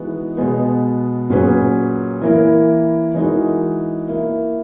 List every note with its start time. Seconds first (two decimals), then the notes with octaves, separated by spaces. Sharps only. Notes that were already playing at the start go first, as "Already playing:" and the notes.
Already playing: E3 G#3 B3 D#4 F#4
0.37 B2 G#3 B3
1.30 A#2 F#3 C#4 G#4 B4
2.22 E3 A#3 E4 A#4
3.15 E3 G#3 D#4 F#4 A#4
4.07 A#3 E4 A#4